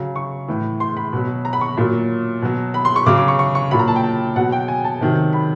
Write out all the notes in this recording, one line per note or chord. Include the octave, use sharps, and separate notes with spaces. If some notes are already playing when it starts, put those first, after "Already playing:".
Already playing: C#3 F#3
C#6
A2 E3
C6
B5
B2 F#3
A#5
B5
C#6
A#2 F#3
B2 F#3
B5
C6
C#6
C#3 F#3 D6
D6
C#6
C#6
C#6
A#2 F#3 B5
A#5
A5
G5
B2 F#3 F#5
G5
G#5
A5
C3 D#3 F#3
B5